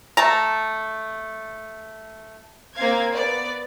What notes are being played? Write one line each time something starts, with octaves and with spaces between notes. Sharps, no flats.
A3 A5 A#5
A#3 C4 F5 G#6
B3 D5